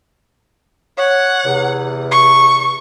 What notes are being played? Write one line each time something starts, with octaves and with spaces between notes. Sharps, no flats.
C#5 F#5
E2 C3
C#6